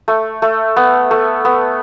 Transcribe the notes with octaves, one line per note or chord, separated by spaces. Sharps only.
A3
A3
B3
A3
B3